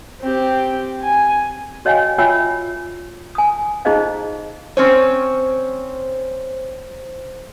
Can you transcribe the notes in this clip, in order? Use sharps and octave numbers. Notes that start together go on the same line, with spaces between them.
C4 G4
G#5
F#4 C#5 D#5 F5 G5 G#5
F4 C#5 E5 G5 G#5 E6
G#5 D#6
D#4 E4 G#4 C5 D#5 F5
C4 C#4 C5 C#5